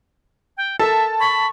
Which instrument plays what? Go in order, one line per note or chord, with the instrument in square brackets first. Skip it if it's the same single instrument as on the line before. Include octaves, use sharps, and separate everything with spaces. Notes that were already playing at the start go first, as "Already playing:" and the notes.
[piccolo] G5
[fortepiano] A4 A#4 [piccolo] E5 [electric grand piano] A5
[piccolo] B5 [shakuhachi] C#6